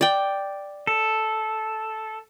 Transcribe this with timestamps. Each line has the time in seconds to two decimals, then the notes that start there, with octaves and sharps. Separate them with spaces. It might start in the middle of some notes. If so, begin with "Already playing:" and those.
0.01 D5 G5
0.87 A4